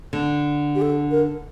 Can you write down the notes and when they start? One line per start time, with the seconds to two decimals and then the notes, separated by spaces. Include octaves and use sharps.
0.13 D3
0.75 G4
0.82 A4
1.11 A#4